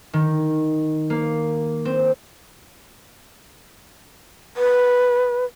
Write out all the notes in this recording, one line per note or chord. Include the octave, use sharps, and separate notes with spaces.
D#3
A#3
C4
B4